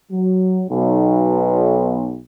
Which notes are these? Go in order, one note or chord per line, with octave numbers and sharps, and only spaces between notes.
F#3
B1